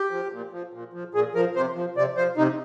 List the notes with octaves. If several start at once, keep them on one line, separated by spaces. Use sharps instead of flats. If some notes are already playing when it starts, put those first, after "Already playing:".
Already playing: G4
F3
A#2
F3
A#2
F3
A#2 G#4
F3 A#4
C3 C5
F3
C3 D5
F3 C5
C3 D#4